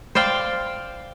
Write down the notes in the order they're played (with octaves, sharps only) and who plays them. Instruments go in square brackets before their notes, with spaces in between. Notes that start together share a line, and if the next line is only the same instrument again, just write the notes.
[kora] C5 D5 F5 G5